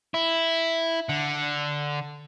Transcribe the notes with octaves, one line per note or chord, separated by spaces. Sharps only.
E4
D3